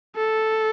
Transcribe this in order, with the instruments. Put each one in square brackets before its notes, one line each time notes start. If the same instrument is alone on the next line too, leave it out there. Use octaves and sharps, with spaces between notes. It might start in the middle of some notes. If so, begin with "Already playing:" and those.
[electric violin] A4